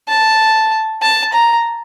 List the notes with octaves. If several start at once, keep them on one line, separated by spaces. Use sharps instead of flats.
A5
A5
A#5